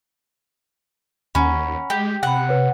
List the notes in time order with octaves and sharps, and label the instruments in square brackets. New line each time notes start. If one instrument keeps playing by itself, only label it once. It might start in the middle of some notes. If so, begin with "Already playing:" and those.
[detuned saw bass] D#2 [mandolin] C#4 [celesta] F#5 A#5 B5
[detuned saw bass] G#3 [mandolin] G4
[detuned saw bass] C3 [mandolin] F#5 [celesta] G5 B5
[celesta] B4 C#5